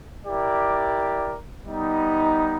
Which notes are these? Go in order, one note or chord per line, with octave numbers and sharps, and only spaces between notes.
E4 G4 A#4 D5
G3 B3 D#4